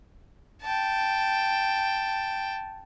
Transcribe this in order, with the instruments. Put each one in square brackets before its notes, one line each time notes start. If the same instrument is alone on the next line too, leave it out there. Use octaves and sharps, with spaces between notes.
[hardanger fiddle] G5 A5